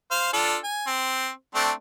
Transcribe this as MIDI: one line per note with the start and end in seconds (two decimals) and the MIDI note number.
0.11 0.29 72
0.11 0.29 77
0.33 0.56 62
0.33 0.56 65
0.33 0.56 69
0.64 0.86 80
0.87 1.29 60
1.55 1.71 57
1.55 1.71 60
1.55 1.71 62